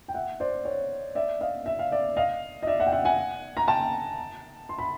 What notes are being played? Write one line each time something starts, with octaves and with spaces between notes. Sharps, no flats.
G5
E5 F#5
C5 D5
C#5
D5 E5
D#5 F5
E5
F5
D5 E5
D#5 F5
D#5
D5 E5
E5 F#5
G5
E5 F#5
F#5 G#5
A#5
G5 A5
C6
B5